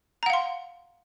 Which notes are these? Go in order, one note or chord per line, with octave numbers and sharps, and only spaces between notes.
F5 F#5 A#5 C6